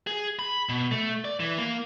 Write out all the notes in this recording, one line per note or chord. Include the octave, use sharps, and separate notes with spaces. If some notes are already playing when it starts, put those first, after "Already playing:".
G#4
B5
B2
A3
D5
E3
A#3